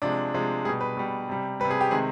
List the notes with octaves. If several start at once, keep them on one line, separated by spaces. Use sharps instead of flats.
C3 F3 G#3 D4
C3 F3 G#3
B2 G3 G#4
B4
B2 G3
C3 G3
C3 G3 B4
G#4
G4
C3 D#3 G#3 G#4